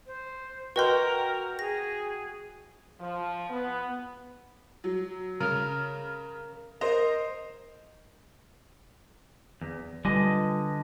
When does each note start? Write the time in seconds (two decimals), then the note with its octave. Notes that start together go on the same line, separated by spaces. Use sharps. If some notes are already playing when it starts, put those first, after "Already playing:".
0.06 C5
0.76 F#4 A#4 B4 D#5 G5 C6 G6
1.59 G#4 A#6
3.01 F3
3.50 B3
4.84 F#3
5.40 C#3 A#4 F6
6.81 A#4 C5 D#5
9.61 E2
10.05 D3 G3 F4 B4 D#5 G#5 D#6